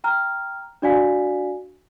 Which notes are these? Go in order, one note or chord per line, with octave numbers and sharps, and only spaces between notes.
G5 A#5 F6
D4 F#4 D5 F5 G#5 B6